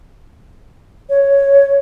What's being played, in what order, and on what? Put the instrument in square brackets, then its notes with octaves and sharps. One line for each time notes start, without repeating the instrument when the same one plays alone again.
[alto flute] C#5